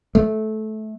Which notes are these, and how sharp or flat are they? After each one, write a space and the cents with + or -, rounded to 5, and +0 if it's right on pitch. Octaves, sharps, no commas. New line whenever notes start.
A3 -20